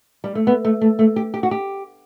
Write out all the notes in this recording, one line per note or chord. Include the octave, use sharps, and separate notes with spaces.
G3
A3
B3
A3
A3
A3
G4
G4
F#4
G4